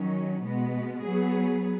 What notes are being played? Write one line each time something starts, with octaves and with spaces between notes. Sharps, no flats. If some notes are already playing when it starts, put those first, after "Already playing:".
Already playing: D#3 F#3 C#4
B2 G#3 B3
F#3 B3 G#4